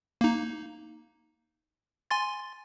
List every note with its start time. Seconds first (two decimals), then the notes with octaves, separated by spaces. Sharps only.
0.21 A#3 D#4
2.11 G#5 C6 A6